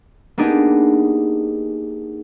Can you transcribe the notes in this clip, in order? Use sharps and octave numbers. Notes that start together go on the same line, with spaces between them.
A#3 B3 D4 D#4 G4 G#4